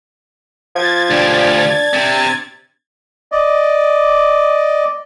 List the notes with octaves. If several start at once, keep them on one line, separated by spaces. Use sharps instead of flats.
F3 G#6 A6
D2 D4 G4
C3 C4
D5 D#5